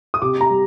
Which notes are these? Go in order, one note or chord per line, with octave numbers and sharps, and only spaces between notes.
D#6
C3 D6
A#5
G3